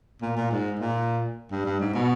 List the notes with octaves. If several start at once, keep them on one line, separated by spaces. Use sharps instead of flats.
A#2
A#2
G#2
A#2
G2
G2
G#2
B2